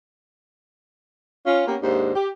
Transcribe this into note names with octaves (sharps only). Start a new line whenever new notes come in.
C#4 F4
A#3 B3 C#4 G4
D#2 G#2 D4 C5
G4